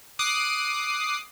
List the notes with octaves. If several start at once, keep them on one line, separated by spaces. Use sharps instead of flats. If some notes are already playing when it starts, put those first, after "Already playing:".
D6 D#6 F#6 C7